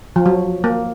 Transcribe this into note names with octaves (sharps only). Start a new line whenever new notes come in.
F3
F#3
A#3